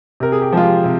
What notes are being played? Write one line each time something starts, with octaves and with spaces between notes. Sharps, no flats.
C3 A#4
G#4
G4
F3 G#3 F4
G4
C3